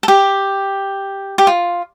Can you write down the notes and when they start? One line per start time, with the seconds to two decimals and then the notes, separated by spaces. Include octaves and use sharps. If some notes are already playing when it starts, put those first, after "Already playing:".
0.03 A4
0.08 G4
1.38 G4
1.47 F4